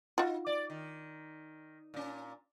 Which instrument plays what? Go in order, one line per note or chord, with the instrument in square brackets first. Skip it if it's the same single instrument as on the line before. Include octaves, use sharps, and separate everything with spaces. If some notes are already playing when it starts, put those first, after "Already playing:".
[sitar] D#4 [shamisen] F4 F#4
[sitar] D5
D#3
A#2 C#4